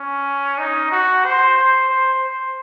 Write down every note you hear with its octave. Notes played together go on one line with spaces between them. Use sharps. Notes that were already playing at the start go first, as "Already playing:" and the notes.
Already playing: C#4
D#4
F#4
C5
C5
C5
C5